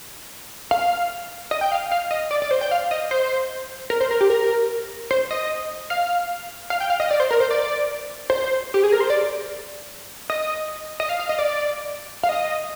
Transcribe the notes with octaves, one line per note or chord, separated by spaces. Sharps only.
F5
D#5
G5
F5
F5
D#5
D5
D5
C5
G5
F5
D#5
C5
A#4
C5
A#4
G4
A#4
C5
D#5
F5
F5
G5
F5
D#5
D5
C5
A#4
C5
D5
C5
G4
G#4
A#4
C5
D5
D#5
D#5
F5
F5
D#5
D5
F5
D#5